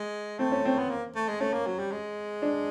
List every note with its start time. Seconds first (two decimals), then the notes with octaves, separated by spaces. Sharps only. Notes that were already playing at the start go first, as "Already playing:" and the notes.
Already playing: G#3
0.39 A3 C4
0.52 C#4
0.65 C4
0.78 B3
0.90 A#3
1.15 A3
1.28 G#3
1.40 A3 C#4
1.53 A#3
1.67 F#3
1.79 G3
1.92 G#3
2.42 D4